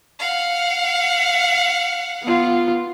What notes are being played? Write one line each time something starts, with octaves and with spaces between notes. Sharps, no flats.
F5 F#5
B3 F4